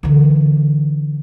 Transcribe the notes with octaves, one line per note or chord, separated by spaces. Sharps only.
D3 E3